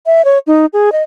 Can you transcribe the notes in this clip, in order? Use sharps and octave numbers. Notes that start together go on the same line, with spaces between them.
E5
C#5
D#4
G#4
D#5